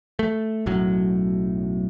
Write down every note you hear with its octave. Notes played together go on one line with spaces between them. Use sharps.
A3
B1 F#2 A2 F#3